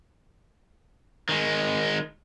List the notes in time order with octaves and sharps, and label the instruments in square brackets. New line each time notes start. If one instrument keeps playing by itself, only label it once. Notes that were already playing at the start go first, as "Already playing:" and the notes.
[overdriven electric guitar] D#3 G#3